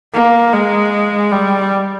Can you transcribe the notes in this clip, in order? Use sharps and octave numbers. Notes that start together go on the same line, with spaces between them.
A#3
G#3
G3